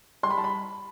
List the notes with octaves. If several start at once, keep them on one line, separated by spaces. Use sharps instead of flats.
G3 C6
B5
A5
B5